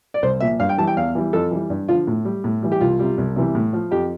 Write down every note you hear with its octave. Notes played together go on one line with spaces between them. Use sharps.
D5
C2 C5
A#2 F3 E5
G2 F5
G5
E3 G3 A5
G5
E2 F5
E3 G3
F2 A4
E3 G3
G2
D3 F3 F4
A2
G3
A2
E3 G3
G4
C2 F4
C3 G3
C2
C3 E3 G3
A2
F3
F2 G4